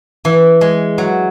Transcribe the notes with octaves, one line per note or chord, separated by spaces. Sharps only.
E3
G#3
F#3